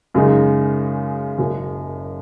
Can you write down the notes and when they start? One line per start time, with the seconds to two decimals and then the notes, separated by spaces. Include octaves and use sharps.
0.14 F#2 C#3 G#3 D#4
1.38 F#1 F#2 F#3